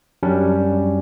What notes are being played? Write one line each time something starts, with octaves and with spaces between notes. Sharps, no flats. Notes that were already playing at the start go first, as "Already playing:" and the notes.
F#2 G3 C#4 D4